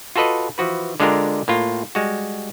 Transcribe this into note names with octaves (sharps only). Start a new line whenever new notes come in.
F4 F#4 A4 B4 D#5
E3 F3 F#4 B4
D3 G#3 D4 F4 G4 A#4
A2 A#3 F4
G3 G#3 F#4